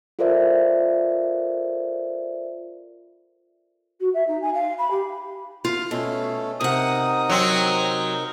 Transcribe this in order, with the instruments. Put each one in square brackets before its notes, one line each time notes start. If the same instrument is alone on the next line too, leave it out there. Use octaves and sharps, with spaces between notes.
[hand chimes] F4 A4 A#4 C5 D5 E5
[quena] F#4
E5
D#4
G#5
F5
B5
G4
[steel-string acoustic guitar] F4
[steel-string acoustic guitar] B2 [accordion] A3 C#4 A4
[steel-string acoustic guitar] C3 F#5 [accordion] D#4 A#4 [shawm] D#6
[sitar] F#3 C4